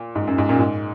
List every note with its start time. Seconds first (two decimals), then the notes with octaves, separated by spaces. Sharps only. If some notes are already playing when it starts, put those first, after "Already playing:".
Already playing: A#2
0.15 G#2
0.27 F#2
0.38 G#2
0.49 F#2 A#2
0.60 G#2